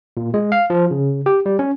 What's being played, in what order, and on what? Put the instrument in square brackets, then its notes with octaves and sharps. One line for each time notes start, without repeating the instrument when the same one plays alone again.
[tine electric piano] A#2
G#3
F5
F3
C#3
G4
G3
C#4